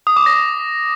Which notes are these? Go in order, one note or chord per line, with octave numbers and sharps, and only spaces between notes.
D#6
D6
A#6